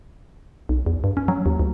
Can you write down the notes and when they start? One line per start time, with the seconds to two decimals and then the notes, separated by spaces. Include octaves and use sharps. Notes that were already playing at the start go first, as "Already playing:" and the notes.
0.69 B1
0.86 E2
1.04 G2
1.17 C#4
1.28 F#3
1.46 D#2
1.60 D2